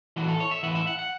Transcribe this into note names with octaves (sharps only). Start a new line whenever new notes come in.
A2 E3 F#4
A4
C#5
E5
A2 E3 F#5
E5
F#5
F#5